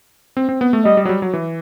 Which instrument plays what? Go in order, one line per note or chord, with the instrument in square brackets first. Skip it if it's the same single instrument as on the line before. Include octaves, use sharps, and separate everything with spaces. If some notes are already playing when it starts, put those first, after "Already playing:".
[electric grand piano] C4
C4
B3
A3
[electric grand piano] G3 [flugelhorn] D#5
[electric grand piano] G3
F#3
G3
F#3
E3